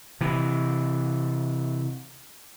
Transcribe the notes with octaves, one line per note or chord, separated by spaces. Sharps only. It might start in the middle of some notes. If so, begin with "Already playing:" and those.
C3 E3